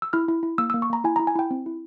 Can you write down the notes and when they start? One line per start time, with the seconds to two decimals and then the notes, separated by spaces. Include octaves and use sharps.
0.02 E6
0.13 E4 F6
0.28 E4
0.43 E4
0.58 A#3 E6
0.70 E6
0.74 A#3
0.82 C#6
0.90 A#3 A#5
1.04 E4 G#5
1.16 A#5
1.19 E4
1.27 G#5
1.35 E4 G5
1.51 C4
1.66 E4